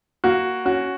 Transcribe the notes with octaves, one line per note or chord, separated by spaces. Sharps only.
A#3 F#4
C#4 F#4